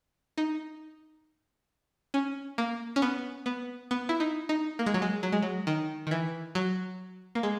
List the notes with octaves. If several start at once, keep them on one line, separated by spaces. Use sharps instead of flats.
D#4
C#4
A#3
C#4
B3
B3
B3
E4
D#4
D#4
A#3
G#3
F#3
G#3
F#3
G#3
F#3
D#3
D#3
E3
F#3
A#3
G#3